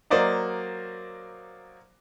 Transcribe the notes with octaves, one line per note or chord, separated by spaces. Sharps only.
F#3 A#3 C5 D5 D#5 F5